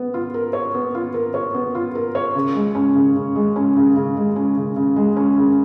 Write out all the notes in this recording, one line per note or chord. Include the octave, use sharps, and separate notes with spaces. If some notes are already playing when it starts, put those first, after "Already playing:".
Already playing: B3
F4
A#4
C#5
B3
F4
A#4
C#5
B3
F4
A#4
C#5
C#3
G#3
C#4
C#3
C#3
G#3
C#4
C#3
C#3
G#3
C#4
C#3
C#3
G#3
C#4
C#3